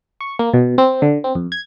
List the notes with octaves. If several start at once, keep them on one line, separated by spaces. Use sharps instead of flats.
C#6
A#3
B2
C4
D3
C4
F2
G#6